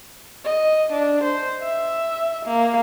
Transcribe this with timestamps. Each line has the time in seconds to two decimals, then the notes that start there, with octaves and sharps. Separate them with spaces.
0.45 D#5
0.93 D4
1.23 C5
1.62 E5
2.45 A#3